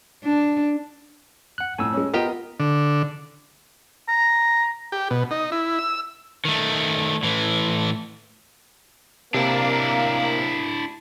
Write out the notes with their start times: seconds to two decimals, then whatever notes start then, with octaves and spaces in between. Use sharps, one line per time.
0.24 D4
1.58 F#5 F#6
1.78 F2 A2 G#5 E6
1.93 G#3 C#4
2.14 B3 F4 G4 A#4 D#5 G5
2.60 D3
4.08 A#5
4.92 G4
5.10 B2
5.31 D#4
5.52 E4
5.79 E6
6.45 D#3 A3
7.23 A2 E3
9.34 C3 A#3 D4 E4